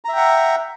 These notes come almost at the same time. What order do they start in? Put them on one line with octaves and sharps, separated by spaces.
A#5 E5 G5 F#5